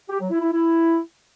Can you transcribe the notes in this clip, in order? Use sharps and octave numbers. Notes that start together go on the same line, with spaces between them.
G4
F#3
E4
E4
E4